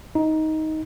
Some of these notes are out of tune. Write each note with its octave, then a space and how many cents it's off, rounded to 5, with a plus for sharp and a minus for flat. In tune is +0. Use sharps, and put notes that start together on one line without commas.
D#4 +10